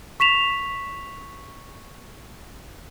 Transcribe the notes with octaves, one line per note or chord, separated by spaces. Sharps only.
C#6 B6 E7 F7